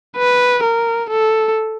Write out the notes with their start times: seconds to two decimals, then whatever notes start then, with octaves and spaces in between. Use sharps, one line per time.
0.17 B4
0.63 A#4
1.09 A4